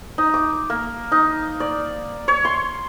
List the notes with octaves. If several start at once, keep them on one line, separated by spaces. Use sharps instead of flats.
D#4
D6
A#3
D#4
D5
C#5
C6